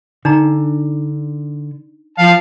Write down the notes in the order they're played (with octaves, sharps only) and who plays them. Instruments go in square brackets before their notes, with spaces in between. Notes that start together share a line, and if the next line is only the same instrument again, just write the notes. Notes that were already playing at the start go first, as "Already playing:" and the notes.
[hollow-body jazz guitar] D3 [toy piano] D4 D#4 A#5
[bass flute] F3 [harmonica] F5 A5